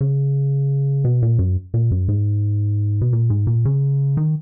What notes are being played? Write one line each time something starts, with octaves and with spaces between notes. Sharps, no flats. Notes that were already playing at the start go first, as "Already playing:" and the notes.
C#3
B2
A#2
F#2
A#2
F#2
G#2
B2
A#2
G#2
A#2
C#3
D#3